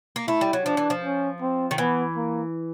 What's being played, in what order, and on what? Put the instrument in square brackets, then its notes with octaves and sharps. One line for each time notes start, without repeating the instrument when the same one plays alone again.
[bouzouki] A#3
[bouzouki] A3 [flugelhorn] E4
[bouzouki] G3
F#3
[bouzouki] F3 [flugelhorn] D4
[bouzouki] E3
F3
[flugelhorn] C#4
C4
[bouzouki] D#3
[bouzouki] E3 [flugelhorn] B3
[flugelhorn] A#3